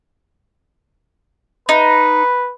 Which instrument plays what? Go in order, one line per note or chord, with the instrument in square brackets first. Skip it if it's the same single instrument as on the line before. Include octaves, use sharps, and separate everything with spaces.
[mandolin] D#4 [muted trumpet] B4